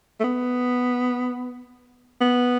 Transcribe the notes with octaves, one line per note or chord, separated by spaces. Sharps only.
A3
B3
B3